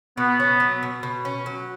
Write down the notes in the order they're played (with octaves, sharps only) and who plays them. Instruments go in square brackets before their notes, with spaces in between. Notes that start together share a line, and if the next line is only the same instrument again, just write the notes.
[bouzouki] B2 [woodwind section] B3
[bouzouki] C#4
F#3
B2
B2
C#4
F#3